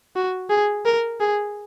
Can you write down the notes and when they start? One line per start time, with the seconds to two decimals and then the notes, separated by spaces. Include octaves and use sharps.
0.16 F#4
0.50 G#4
0.86 A#4
1.20 G#4